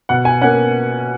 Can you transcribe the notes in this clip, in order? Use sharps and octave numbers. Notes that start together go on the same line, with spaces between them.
B2 F#5
G#5
A#3 C#4 F#5